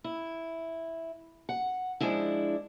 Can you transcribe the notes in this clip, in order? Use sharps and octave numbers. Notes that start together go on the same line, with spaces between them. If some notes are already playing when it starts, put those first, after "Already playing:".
E4
F#5
F3 G#3 D4 E4